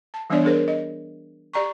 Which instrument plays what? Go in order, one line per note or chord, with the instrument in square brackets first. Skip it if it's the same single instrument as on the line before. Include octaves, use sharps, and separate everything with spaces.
[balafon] A5
E3 G3 B3 D4 C#5 D5
D4 G#4 A#4 C5
D#5
G4 D5 A#5 C#6